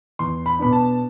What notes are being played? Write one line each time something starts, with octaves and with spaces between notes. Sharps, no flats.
E2 C6
B5
B2 B3 D4 B5
A5